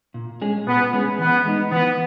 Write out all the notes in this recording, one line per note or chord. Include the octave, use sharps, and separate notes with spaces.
A#2
G#3 C#4 G#4
A#2 B3
G#3 C#4 G#4
E3 B3
G#3 D#4
E3 B3